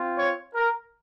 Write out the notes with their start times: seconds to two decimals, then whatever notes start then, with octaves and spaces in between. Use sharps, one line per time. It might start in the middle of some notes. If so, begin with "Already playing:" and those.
Already playing: C4 F4
0.16 C#5
0.55 A#4